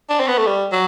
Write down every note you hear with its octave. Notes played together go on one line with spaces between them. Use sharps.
D4
C4
B3
A3
G3
F#3